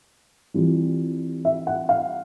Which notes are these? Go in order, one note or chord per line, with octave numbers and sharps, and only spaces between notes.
E3 G3 C4 F4
E5
F#5
F5